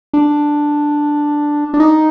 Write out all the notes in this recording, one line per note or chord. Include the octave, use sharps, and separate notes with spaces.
D4
D4
D#4